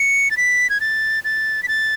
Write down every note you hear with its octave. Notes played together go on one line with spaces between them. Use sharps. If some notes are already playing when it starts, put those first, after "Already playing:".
Already playing: C#7
A6
B6
G#6
A6
A6
B6
A6